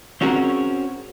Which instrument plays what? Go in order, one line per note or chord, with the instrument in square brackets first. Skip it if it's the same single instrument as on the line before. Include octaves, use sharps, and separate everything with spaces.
[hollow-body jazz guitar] C4 C#4 F#4 G#4 A#4